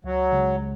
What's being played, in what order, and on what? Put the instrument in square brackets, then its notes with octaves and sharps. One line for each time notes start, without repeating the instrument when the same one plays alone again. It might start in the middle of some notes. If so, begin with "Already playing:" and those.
[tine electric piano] C#2 [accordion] F#3
[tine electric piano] C#3 G#3